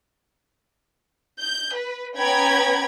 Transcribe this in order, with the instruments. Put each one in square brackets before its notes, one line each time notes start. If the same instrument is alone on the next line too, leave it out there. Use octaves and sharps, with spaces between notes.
[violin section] G6
B4
B3 C#4 G5 A#5 B5 G#6